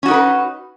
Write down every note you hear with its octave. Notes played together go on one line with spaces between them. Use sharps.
C#4 D#4 F#4 A#4 B4